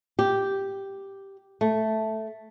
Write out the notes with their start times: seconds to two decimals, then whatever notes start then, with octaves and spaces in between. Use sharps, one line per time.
0.19 G4
1.61 A3